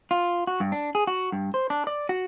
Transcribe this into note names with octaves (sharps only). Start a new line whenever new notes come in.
F4
F#4
G2
D4
G#4
F#4
G2
C5
D4
D5
F#4